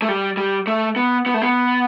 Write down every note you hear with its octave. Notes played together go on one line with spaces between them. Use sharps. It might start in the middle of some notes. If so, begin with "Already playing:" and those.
A3
G3
G3
A3
B3
B3
A3
B3